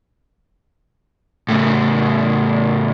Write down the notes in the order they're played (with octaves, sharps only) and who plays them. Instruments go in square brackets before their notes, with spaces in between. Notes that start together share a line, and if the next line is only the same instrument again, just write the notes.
[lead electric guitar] A2 C#3